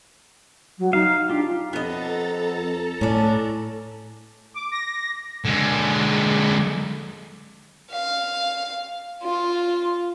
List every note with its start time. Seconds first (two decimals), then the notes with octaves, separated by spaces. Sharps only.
0.79 F#3
0.93 D#4 F5
1.29 D4 F4 G4
1.73 F2 B3 A4 D#5 A5 A#5
3.01 A2 C#4 D4
4.54 D6
4.72 A#6
5.45 D3 G#3
7.91 F5
9.23 F4